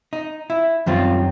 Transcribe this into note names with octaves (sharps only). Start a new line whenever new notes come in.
D#4
E4
F#2 D#3 G3 C4 F4